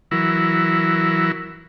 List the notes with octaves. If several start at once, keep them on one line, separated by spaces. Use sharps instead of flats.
E3 F#3 E4 A#4